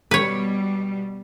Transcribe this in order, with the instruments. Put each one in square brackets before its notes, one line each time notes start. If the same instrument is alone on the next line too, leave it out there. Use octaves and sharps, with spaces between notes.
[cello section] B2 G3 [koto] B4 C#5